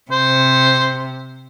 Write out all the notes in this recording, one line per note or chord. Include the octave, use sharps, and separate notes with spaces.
C3 C5